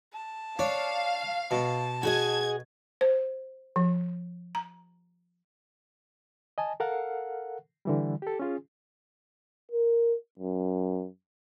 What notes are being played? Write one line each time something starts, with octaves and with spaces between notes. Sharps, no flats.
A5
D4 C#5 F5
B2 A5
F#4 G#4 D#5 G#6
C5
F3
A#5
D#5 G#5 A5
A4 A#4 F5 F#5
D3 E3 G3
G4 A4
C#4 F4 G#4
A#4
F#2